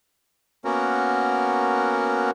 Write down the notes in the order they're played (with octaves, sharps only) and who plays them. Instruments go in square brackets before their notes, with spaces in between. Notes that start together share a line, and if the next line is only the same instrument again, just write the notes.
[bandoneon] A#3 B3 C#4 F#4 A#4